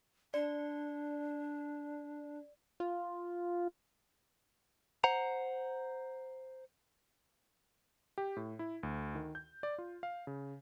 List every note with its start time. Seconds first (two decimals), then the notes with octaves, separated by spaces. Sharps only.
0.34 D4 D5
2.80 F4
5.04 C5 F#5 A#5
8.18 G4
8.37 A2
8.59 E4
8.83 D2
9.15 D#3
9.35 G6
9.63 D5
9.78 F4
10.03 F5
10.27 C#3